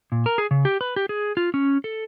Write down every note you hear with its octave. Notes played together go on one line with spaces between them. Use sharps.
A#2
A#4
G#4
C#3
G4
B4
G4
G#4
F4
C#4
A4